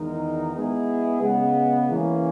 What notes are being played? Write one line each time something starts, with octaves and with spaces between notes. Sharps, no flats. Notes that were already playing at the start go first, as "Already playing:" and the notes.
Already playing: E2 D#3 G#3 D#4 A#4
G#3 B3 E4 G#4
C#3 G#3 B3
E3 A#3 C#4